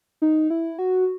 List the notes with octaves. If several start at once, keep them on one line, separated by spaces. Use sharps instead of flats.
D#4
E4
F#4